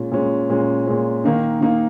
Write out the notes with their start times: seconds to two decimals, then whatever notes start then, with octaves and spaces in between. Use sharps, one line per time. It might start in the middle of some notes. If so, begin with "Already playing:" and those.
Already playing: A#2 G#3 C#4
0.12 A#2 G#3 C#4
0.49 A#2 G#3 C#4
0.86 A#2 G#3 C#4
1.24 D#3 A#3 D#4
1.61 D#3 A#3 D#4